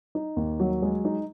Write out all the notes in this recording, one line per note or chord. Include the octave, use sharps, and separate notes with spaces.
D#4
D#2
F#3
G#3
D#4